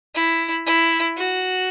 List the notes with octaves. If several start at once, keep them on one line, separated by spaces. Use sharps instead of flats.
E4
E4
F#4